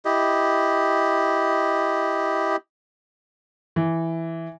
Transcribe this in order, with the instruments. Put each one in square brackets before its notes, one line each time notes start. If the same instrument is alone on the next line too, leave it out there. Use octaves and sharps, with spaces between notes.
[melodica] E4 G4 D#5
[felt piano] E3